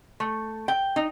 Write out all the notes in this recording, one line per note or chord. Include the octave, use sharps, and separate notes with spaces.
A3
G5
D#4